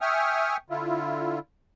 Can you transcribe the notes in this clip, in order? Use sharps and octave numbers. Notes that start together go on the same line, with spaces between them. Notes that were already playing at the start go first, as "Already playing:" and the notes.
E5 G5 G#5 C#6 D#6 F6
D3 E4 F4